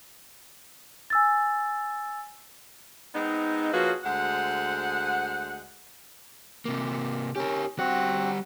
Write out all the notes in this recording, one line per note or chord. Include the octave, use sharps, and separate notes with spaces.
G#5 E6 A6
G#3 B3 C4 D#4
F3 A#3 C#4 F#4 G#4 B4
D2 G#3 C5 F#5
C3 A#3
C#4 G4 A#4
G3 C4 F#4 F#5 F#6